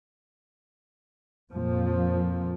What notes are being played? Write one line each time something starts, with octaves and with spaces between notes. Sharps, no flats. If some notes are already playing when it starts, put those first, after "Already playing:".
F2 A#2 F3